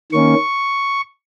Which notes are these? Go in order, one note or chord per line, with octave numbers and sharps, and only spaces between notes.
D#3 A#3 C#4 C#6